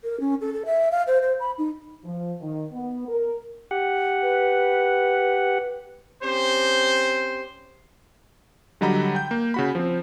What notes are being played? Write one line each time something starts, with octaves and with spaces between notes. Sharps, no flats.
A#4
C#4
A4
A4
E5
F5
C5
C5
B5
D#4
F3
D#3
B3
A#4
G4 F#5
B4
C4 C#4 G4 C5
D3 F#3 G3 D#5 A#5 B5
G5 G6
A#3
C#3 F#4 B5
F3 C4